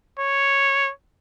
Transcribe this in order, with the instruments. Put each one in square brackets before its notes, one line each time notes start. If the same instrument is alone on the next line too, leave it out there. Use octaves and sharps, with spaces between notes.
[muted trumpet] C#5